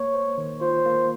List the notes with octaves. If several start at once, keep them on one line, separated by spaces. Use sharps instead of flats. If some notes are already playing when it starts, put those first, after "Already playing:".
Already playing: A#3 C#5
C5
D#3
F4 C5
A#3